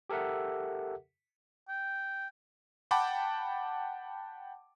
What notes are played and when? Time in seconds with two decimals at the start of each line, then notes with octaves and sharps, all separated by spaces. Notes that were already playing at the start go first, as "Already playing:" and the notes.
0.10 G4 A4 A#4 E5 F#5
1.69 G5
2.91 F#5 G5 A5 B5 D6